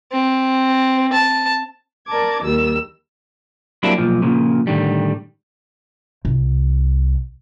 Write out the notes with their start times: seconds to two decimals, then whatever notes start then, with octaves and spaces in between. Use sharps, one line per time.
0.12 C4
1.13 A5
2.07 A#4 D5 A5 D6 G#6
2.43 D#2 D#3 G3 A#4 E6
3.83 F#3 G3 A#3 C4 D4 E4
3.98 B1 A#2 F3
4.22 A#2 C#3 F3
4.67 A2 D3 D#3 G3
6.25 C2